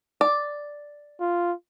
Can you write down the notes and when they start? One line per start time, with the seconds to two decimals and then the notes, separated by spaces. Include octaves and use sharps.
0.21 D5
1.21 F4